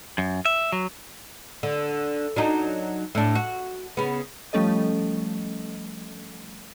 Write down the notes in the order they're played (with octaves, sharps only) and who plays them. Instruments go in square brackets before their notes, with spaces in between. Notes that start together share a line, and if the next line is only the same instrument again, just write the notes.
[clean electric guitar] F#2
E5
F#3
[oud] D3
F#3 D4 D#4
A2 D4
F#4
C#3 B3
[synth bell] F3 G3 A3 C#4 A4 D#5